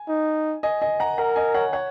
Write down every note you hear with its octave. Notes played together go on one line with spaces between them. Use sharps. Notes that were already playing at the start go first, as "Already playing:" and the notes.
Already playing: G#5
D#4
D#5 G#5
D#5 G#5
F#5 A#5
A#4 F#5 A#5
D#5 G#5
C#5 F#5
C#5 F#5